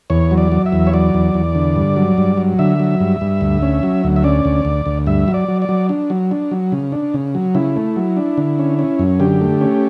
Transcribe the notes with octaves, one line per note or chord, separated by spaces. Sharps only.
E2 C#5
F#3
D5
F#3
E5
E2
C#5
F#3 D5
E2
E2
D3
G2
F#3
G2
F#3
D3 E5
F#3
G2
G2
D2
C#4
F#3
D2
E5
C#4 D5
D2
D2
D2
G2 E5
F#3
D5
F#3
D5
F#3
D4
F#3
D4
F#3
C#3
D4
C#3
F#3
C#3 E4
A3
F#3
D4
D3
C#4
C#4
F#2
D3 G4
A3
C#4